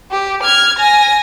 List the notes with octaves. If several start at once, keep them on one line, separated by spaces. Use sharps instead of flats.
G4
F6 G#6
G#5 A#6